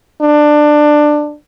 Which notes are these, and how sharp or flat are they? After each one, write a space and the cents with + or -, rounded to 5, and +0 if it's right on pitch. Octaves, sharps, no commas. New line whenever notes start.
D4 +15